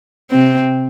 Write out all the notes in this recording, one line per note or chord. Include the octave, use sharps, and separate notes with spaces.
C3 C4